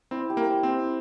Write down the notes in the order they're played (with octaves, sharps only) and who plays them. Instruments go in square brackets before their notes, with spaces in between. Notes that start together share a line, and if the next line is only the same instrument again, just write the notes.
[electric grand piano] C4 [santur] E4
[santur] G4
[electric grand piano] A#3
[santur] C5
[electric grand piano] C4
[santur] E4